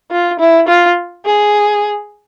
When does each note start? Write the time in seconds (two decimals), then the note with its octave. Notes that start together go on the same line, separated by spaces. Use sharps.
0.11 F4
0.40 E4
0.68 F4
1.26 G#4